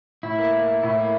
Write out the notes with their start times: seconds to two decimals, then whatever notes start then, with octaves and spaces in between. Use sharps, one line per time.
0.23 A2 E4
0.38 A#3
0.53 A#3
0.68 A#3
0.83 A2
0.98 A#3